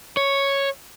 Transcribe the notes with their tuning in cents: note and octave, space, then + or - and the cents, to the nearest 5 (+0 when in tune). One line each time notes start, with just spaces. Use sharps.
C#5 -5